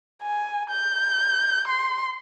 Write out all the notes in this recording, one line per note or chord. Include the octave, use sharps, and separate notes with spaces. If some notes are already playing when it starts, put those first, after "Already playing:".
G#5
G6
C6